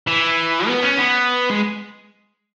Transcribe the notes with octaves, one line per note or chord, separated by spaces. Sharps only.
E3
B3
C#4
B3
G#3